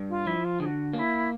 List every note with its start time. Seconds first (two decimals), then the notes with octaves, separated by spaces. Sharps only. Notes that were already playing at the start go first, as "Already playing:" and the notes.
Already playing: G2
0.09 F4
0.26 F3 E4
0.44 F4
0.60 D3 G#4
0.65 F#4
0.93 A#3 F#4
0.99 E4